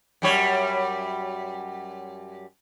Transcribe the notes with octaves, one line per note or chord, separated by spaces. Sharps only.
F#2 G3 C#5